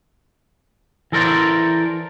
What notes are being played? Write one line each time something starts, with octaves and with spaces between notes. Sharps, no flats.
E3 A4 A#4 C5 D5